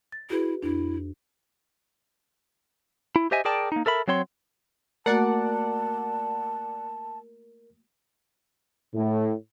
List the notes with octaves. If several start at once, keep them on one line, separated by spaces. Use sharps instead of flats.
A6
E4 F#4 G#4 B4
F2 D4 E4
E4
G4 C5 D#5 E5 G#5
G#4 A#4 D5 G5 A5
A#3 D#4
A4 A#4 E5 B5
F#3 C4 C#5 C6
A3 A#3 F#4 A#4 D5 F#5 A5
A2